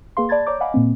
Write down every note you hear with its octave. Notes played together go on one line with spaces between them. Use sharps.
A#3 G#4 B4 F5 C6
D5 A5 B5 G#6 A6
C#5 D5 A#5 D6 G6
D#5 F5 F#5 G#5 B5 D6
A#2 A#3 C4